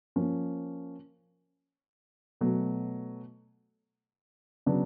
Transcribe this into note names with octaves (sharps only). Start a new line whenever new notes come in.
F3 A#3 C#4
B2 F#3 A3
C#3 F#3 B3 D4